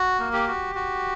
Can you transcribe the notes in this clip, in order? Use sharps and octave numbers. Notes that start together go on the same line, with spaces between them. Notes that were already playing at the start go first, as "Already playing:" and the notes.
Already playing: F#4
A#3
G4
F#4
F#4